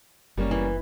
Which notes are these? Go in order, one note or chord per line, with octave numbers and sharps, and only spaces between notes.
F#1 G3 A#3 C#4
E3